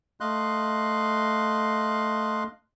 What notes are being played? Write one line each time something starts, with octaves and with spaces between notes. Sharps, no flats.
A3 D#5 F5 C6 F#6